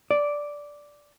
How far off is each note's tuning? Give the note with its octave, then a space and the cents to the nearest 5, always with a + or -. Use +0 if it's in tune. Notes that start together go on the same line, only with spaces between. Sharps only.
D5 -5